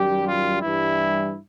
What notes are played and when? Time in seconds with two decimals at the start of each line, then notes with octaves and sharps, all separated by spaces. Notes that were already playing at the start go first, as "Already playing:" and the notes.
Already playing: F#2 D#3 G3 G4
0.26 F4
0.62 G2 E3 G3 E4